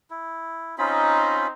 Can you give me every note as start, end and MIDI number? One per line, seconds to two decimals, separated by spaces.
0.11 0.76 64
0.78 1.53 60
0.78 1.47 61
0.78 1.53 63
0.78 1.47 65
0.78 1.47 83